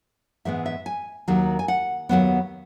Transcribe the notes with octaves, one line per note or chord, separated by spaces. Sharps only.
G#2 E3 G#3 B3 E5
E5
G#5
D#2 D#3 F#3 A#3
G#5
F#5
D#2 C#3 F#3 B3